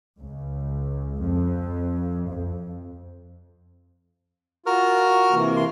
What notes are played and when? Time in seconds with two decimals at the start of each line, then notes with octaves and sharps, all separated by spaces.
0.19 C#2
1.19 F2
2.28 F2
4.66 F4 F#4 A#4 F6
5.32 C3 E3 A#3
5.57 C6